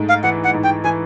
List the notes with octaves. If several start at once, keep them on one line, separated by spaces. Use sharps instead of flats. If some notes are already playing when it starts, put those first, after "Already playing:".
Already playing: G#2 A3
F5
E3 F#5
F#5
G#2
G5
E3 G#5